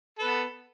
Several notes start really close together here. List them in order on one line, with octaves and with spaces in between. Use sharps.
A4 B4 B3